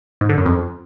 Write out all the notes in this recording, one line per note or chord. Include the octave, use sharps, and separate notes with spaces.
G#2
D3
F#2
F2